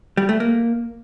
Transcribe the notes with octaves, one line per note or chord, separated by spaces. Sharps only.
G3
A3
A#3